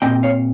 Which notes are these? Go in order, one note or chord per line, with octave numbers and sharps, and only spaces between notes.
A#2 G3 C4 D#5 G5
C#5 F5